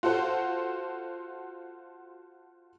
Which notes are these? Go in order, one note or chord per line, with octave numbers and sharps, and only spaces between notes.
F4 F#4 A4 C5 F#5